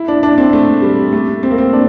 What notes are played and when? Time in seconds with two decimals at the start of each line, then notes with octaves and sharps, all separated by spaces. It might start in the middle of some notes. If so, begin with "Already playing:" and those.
Already playing: E4
0.08 D4
0.23 D4
0.38 C4
0.53 A3
0.82 G3
1.13 A3
1.43 C4
1.51 A#3
1.58 C4
1.73 D4